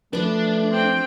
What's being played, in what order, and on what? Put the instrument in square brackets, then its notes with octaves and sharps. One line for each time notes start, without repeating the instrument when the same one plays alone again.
[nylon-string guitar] F3 B4 [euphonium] A3 [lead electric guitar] D4
[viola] C4 G5